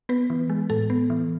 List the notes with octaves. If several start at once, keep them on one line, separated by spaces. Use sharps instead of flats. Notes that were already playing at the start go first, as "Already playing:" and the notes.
B3 B4
E3
G#3
A2 A4
B3
E3